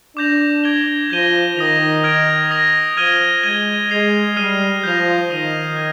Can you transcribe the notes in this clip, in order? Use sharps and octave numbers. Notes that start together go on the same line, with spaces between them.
D4 D6 G6 A#6 F7
D6 G#6 D7 G7
F3 G6 A#6 D#7 G7
D#3 D#6 A#6 F7
F6 G#6 D7 F7
D#6 A#6 F7
F3 F6 G#6 D#7 G7
G#3 G#6 D#7 G7
G#3 G#6 C7 F7
G3 F6 C7 D#7 G7
F3 G6 A#6 F7
D#3 D#6 A#6 D#7
F6 G#6 D#7